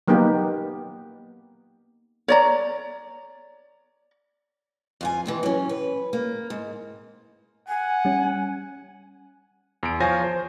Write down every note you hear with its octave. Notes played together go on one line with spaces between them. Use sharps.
F#3 A#3 B3 D#4 G4
C#5 D5 A#5
F2 F4 G#5
D#2 C3 E3
F#3 C#4
B4
A#3
G#2
F#5 G#5
G3 C#4
E2 D7
F3 F4 C5 C#5 G#5 A#6
C5